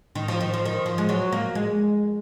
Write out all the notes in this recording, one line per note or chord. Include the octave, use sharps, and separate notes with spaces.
D#3
F3
D#3
F3
D#3
F3
G#3
F#3
A#3
G#3